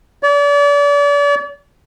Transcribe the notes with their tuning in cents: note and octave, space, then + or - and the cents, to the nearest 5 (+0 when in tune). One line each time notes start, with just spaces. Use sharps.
D5 -40